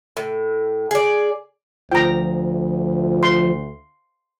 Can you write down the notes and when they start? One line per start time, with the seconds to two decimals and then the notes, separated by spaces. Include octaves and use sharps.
0.17 A2
0.91 G#4 D5
1.92 D2 F3 G5 A#5
3.23 C6